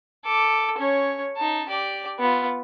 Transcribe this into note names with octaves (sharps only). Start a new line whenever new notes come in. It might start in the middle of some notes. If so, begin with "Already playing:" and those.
A4 D6
C#4 C#5
D#4 A5
G4 D5
B3 F4